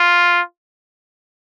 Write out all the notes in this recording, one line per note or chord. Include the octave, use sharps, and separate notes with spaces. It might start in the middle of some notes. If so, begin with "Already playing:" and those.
Already playing: F4